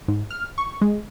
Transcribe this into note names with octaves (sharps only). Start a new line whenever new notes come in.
G#2
F6
C#6
G#3